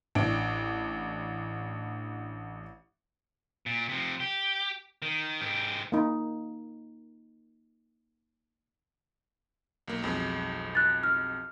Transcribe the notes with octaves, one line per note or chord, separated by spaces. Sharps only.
A1 D4 D7
A#2
C3 F3
G4
D#3
G#2 G4
A#3 D#4
B1 A#3
B1 F2 G#3
F#6 A6
F6